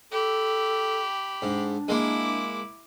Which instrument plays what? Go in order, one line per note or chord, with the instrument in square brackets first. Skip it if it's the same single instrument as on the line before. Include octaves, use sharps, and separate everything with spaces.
[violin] G4 B5 [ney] A4
[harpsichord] G#2 [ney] D4
[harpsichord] G#3 A#3 [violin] E4 D6